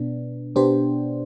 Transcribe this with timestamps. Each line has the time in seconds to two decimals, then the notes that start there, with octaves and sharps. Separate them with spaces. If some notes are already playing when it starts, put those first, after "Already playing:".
Already playing: B2 B3 D4
0.56 B2 B3 D4 G4 C5